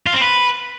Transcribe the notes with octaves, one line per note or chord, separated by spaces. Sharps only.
F4
C4
B4